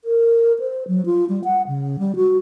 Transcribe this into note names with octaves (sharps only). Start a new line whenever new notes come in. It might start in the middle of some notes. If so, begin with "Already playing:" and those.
A#4
C5
F#3
F4
G3
F#5
C#3
G3
F#4